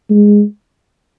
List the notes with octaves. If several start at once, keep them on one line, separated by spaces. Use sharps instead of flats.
G#3